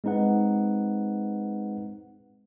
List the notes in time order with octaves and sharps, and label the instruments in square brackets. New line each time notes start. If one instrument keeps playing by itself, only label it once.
[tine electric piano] G#3 C4 D#4 B4 F#5